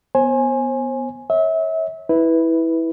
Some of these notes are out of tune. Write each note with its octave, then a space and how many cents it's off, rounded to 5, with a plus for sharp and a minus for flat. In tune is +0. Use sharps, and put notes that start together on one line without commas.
B3 +0 C5 +40 G#5 +0
C#5 -10 E5 -30
E4 -15 B4 +0